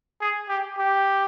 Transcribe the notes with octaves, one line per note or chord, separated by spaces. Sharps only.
G#4
G4
G4